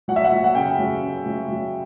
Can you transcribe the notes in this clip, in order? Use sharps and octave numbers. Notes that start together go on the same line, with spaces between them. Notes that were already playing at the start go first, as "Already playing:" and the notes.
F#3 F#5
E5
F#5
F#3
F#5
C#3 G5
F#3
C#3
F#3
F#3